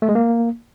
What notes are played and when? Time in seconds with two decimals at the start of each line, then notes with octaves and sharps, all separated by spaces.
0.02 A3
0.09 G#3
0.15 A#3